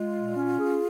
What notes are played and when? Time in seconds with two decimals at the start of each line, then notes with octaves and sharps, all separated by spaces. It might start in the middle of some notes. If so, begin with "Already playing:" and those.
Already playing: G#3 F4
0.15 A#2
0.36 C#4
0.58 G#4